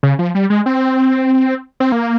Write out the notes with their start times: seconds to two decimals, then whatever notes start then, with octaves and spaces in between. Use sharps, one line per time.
0.03 C#3
0.19 F3
0.35 G3
0.50 G#3
0.66 C4
1.80 C4
1.92 A#3